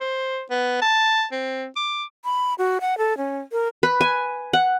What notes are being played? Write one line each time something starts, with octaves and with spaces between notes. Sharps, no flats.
C5
B3
A5
C4
D6
B5
F#4
F#5
A4
C#4
A#4
B4
G#5
F#5